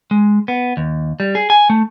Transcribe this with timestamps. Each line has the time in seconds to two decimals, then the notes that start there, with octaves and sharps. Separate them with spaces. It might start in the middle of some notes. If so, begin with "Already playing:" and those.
0.11 G#3
0.48 B3
0.77 D#2
1.20 G3
1.35 G#4
1.50 G#5
1.70 A3